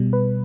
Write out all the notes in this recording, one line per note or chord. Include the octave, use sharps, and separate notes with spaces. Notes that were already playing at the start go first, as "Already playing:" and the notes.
Already playing: B2 G3
B4